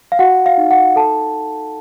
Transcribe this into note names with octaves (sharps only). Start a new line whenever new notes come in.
F5
F#4 F#5
F5
D#4
F#5
A4 A5